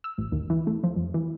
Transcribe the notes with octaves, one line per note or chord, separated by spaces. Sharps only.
E6
A1
D#2
E3
A3
F3
F2
E3